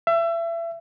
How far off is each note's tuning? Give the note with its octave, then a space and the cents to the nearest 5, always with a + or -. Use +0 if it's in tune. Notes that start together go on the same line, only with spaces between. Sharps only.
E5 +30